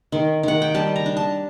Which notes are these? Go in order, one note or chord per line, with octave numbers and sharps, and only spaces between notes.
D#3
D#3 F#5
G5
G3 A5
A#5
D4
A5